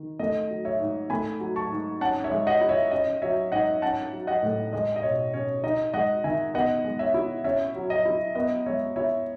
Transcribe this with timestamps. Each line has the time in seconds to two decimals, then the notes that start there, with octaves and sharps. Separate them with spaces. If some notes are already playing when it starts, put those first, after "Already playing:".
Already playing: D#3
0.19 A3 D#5
0.50 F#3
0.65 C#5 E5
0.80 G#2
1.10 A3 G#5 B5
1.40 F#3
1.56 A5 C#6
1.70 G#2
2.01 C#4 F#5 A5
2.24 C#5 E5
2.31 G#3
2.47 D#5 F#5
2.61 E4
2.69 C#5 E5
2.91 C#4 D#5
3.22 F#3 C#5 E5
3.52 G#2 D#5 F#5
3.82 C#4 F#5 A5
4.12 F#3
4.27 D#5 F#5
4.43 A2
4.73 G#3 D#5
4.96 D#5
5.03 B2 C#5
5.34 C#4 C#5
5.64 D#4 D#5
5.94 G#3 D#5 F#5
6.24 D#3 E5 G#5
6.54 B3 D#5 F#5
6.84 G#3
6.99 C#5 E5
7.14 E4
7.44 C#4 C#5 E5
7.76 F#3
7.90 D#5
8.05 E4
8.35 B3 D#5
8.66 G#3 C#5 E5
8.96 E4 C#5 E5